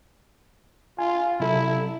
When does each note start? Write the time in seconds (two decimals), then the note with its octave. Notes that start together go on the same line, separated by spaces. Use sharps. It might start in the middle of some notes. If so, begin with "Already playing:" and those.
0.98 F4 G#5
1.40 C3 F#3 E4 A4